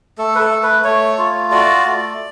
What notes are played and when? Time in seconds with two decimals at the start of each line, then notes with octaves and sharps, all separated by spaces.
0.18 A3 A4
0.35 B4
0.40 A4
0.51 A3
0.63 B4
0.84 A3 C#5
1.18 F4
1.52 F#4 D5
1.85 A3